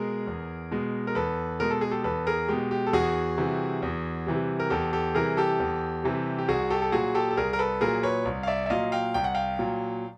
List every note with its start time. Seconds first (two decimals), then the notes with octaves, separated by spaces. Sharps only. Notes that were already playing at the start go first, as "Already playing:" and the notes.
Already playing: B2 G#3 G#4 A#4
0.27 E2
0.71 B2 G#3
1.07 A#4
1.15 E2 A4 B4
1.60 B2 G#3 A#4
1.71 A4
1.81 G#4
1.91 G4 A4
2.04 E2 A4 B4
2.27 G#4 A#4
2.48 B2 G#3 G4
2.71 G4
2.87 A4
2.93 E2 F#4 G#4
3.38 C3 E3 G3
3.82 E2
4.26 C3 E3 G3
4.60 A#4
4.70 E2 G4 A4
4.93 G4 A4
5.15 C3 E3 G3 G#4 A#4
5.37 G4 A4
5.60 E2
6.03 C3 E3 G3
6.38 G4
6.48 C2 F#4 G#4
6.70 G4 A4
6.82 A4
6.92 A#2 F#3 F#4 G#4
7.14 G4 A4
7.31 A4
7.37 C2 G#4 A#4
7.53 A#4
7.59 A4 B4
7.81 A#2 F#3 G#4 A#4
8.03 B4 C#5
8.25 C2
8.43 F5
8.47 D5 E5
8.66 E5
8.70 A#2 F#3 D#5 F5
8.92 F5 G5
9.14 C2 G5
9.24 F#5
9.35 F5 G5
9.59 A#2 F#3